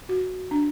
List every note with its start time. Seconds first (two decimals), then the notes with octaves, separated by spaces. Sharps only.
0.09 F#4
0.51 D4